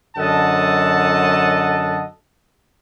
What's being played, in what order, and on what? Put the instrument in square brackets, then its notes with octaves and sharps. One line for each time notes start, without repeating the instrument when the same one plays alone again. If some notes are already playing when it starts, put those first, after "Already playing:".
[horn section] F#2 D3 A4 D#5 F#5 A5